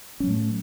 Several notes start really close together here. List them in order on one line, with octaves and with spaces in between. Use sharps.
C#4 F#3 A2 A3